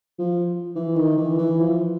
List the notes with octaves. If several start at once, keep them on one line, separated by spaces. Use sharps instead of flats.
F3
E3
D#3
E3
E3
F3